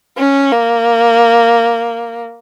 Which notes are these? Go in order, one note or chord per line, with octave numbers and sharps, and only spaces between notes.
C#4
A#3